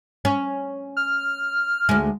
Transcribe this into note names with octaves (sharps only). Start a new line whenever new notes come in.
C#4
F6
D2 G#3